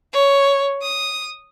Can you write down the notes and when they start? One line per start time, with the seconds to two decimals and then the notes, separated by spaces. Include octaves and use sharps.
0.13 C#5
0.82 D#6